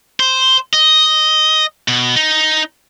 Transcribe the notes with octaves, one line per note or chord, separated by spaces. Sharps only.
C5
D#5
B2
D#4